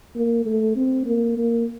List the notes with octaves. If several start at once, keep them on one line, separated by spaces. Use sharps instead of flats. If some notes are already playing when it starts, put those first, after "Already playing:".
A#3
A3
C4
A#3
A#3